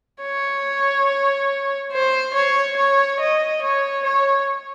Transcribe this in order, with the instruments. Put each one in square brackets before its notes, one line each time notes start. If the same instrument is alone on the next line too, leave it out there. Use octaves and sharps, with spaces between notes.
[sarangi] C#5
C5
C#5
C#5
D#5
C#5
C#5